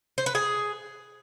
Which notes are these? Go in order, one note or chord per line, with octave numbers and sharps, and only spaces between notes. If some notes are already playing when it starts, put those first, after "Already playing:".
C5
B4
G#4